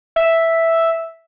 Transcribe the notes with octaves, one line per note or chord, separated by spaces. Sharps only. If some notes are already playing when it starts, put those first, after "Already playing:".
E5